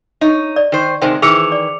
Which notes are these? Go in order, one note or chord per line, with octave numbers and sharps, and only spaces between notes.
D#4 C#5 D#5
D5
D#3 C5
C3 D#3 G#3 C5 G5
D#3 E3 G#4 D6 E6 C#7 F7
D5